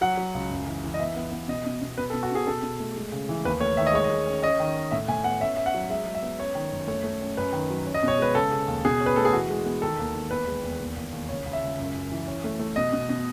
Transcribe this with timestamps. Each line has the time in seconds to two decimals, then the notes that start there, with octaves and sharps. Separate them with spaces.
0.01 F#3 F#5
0.17 F#3
0.34 C#2
0.50 F#2
0.68 E3
0.84 E3
0.94 D#5
0.99 B3 E5
1.16 B3
1.32 B3
1.48 B2 D#5
1.66 B2
1.82 B2
1.98 B2 B4
2.10 A4
2.13 B2
2.23 F#4
2.31 B2 G#4
2.47 B2 A4
2.62 B2
2.80 A3
2.96 G#3
3.12 C#3
3.29 E3
3.45 D#2 B4
3.61 A3 C#5
3.77 D#3 E5
3.87 D#5
3.94 G#3 C#5
4.04 D#5
4.10 G#3
4.26 C#4
4.42 C#4 D#5
4.60 D#3
4.76 C#4
4.91 A2 E5
5.08 A2 G#5
5.24 B3 F#5
5.40 C#4 E5
5.56 C#4 E5
5.66 F#5
5.74 F#3
5.90 G#3 E5
6.06 G#3
6.15 E5
6.23 B3
6.39 C#4 C#5
6.55 D#3
6.72 F#2
6.88 A3 C#5
7.04 A3
7.21 C#4
7.37 F#2 B4
7.53 D#3
7.70 F#3
7.87 C#4
7.94 D#5
8.03 B2 C#5
8.18 G#3 B4
8.35 C#3 A4
8.52 C#3
8.68 D#2
8.85 B2 G#4
9.01 C#4
9.06 B4
9.16 A3 A4
9.25 G#4
9.33 E3 F#4
9.50 G#3
9.65 B3
9.82 D#3 A4
9.99 D#2
10.15 D#2
10.31 E2 B4
10.47 G#3
10.63 E2
10.80 D#2
10.96 D#2
11.12 D#2
11.29 C#2 C#5
11.46 C#2
11.53 E5
11.62 C#2
11.79 F#2
11.94 F#2
12.12 E3
12.28 C#4
12.44 A3
12.59 A3
12.76 B2 D#5
12.93 B2
13.09 B2